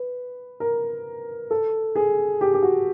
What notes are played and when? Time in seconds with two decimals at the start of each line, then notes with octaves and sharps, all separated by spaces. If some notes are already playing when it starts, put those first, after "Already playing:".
Already playing: B4
0.60 A#4
1.51 A4
1.95 G#4
2.41 G4
2.54 G4
2.63 F#4